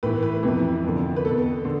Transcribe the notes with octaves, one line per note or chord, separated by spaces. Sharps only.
A2 E3 B4
B4
F2 C3 E3
F2 D3
B4
E2 B2 A4
D3